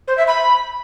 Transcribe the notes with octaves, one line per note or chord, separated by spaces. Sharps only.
C5
E5
B5